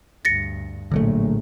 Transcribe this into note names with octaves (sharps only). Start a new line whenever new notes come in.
D2 G2 A6 A#6 C#7
A#1 A2 D3 F#3 A3